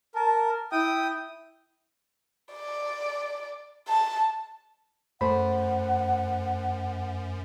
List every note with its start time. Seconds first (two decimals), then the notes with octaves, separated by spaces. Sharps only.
0.15 A#4 A5
0.72 E4 G5 D#6
2.54 D5
3.88 A5
5.21 F#2 A3 C5 F#5 B5